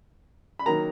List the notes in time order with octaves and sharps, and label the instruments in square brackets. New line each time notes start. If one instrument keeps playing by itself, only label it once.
[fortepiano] B5
D#3 F#3 A#3 A#5